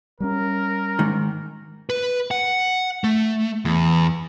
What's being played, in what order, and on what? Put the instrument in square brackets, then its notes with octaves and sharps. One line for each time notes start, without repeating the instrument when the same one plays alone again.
[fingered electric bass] G3 B3 C#4 [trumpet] A#4
[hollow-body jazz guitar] G#2 D#3
[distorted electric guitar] B4
F#5
A3
E2